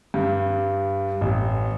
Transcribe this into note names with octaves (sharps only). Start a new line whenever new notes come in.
G2
A1